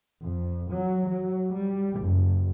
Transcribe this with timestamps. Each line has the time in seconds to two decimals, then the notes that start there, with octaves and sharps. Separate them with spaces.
0.24 F2
0.72 F#3
1.09 F#3
1.52 G3
2.02 F#1